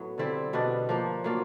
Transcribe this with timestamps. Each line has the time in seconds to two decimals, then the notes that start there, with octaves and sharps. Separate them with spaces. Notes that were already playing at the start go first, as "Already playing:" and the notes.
Already playing: A2 F#3 B3
0.18 D3 G3 C4 E4
0.53 B2 G3 B3 D4
0.89 F3 A#3 D4
1.24 F#3 A#3 D4 F4